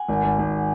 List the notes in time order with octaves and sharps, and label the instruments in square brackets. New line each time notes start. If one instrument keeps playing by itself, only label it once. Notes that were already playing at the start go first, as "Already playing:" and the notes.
Already playing: [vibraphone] F#5 G#5
[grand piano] G#1
G#1
G#1